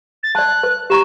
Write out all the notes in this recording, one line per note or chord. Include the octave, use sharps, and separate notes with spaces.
A6
D5 A5 F#6
B4
G4 A#5 C#6 E7